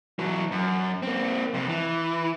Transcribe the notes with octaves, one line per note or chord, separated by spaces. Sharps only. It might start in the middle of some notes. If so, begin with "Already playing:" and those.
E3 F#3
F#2
A#3 C4
F2 C3
E3